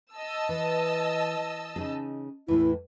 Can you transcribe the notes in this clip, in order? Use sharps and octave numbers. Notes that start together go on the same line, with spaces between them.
D#5 A5 E6
E3
C#3 D#4 G#4
E2 A2 E3 E4